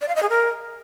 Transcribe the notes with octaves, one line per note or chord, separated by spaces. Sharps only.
D5
F5
D#5
G#4
A#4